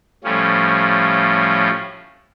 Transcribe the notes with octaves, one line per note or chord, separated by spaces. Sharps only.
A2 F3 G3 C#4